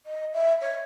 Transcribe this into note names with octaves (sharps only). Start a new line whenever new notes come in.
D#5
E5
C#5